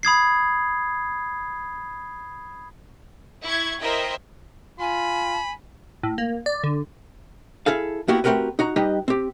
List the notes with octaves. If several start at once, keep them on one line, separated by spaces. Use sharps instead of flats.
B5 D#6 G#6 C7
E4 C#6 G#6
E4 A#4 C5 D#5 E5 G5
F4 G#5 B5
A2
A#3
D5
D3
E4 G#4 A4 F5
A#3 B3 E4 F#4 G4
A3 C4 F#4 G4 A#4 B4
D#4 F#4 A#5
G3 D#4 G4 B4 D#5
C4 G4